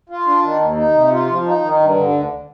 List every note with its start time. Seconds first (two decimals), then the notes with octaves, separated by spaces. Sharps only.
0.09 F4
0.27 D4
0.43 D#3
0.60 D#2
0.77 D#4
0.94 C3
1.12 F4
1.27 F3
1.45 D#4
1.63 D#3
1.80 G2
1.96 D3
2.13 D2